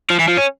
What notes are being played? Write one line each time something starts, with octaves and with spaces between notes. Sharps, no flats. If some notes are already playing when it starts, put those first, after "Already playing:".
F3
E3
F3
C#4